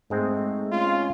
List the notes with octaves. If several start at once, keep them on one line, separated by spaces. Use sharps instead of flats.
G#2 G#3 A3 C4
C#4 F4